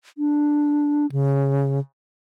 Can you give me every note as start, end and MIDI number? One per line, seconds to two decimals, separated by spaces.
0.18 1.06 62
1.12 1.79 49